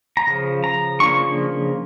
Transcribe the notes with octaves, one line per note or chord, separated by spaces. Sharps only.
A#5
C#3 F3
A#5
C#3 F3 A#3 D4 F4 C#6